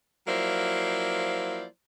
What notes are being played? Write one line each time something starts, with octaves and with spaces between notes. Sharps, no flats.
F3 F#3 A#3 E4 C5 D5